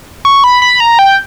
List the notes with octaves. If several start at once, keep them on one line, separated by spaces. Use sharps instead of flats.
C#6
B5
B5
A#5
G5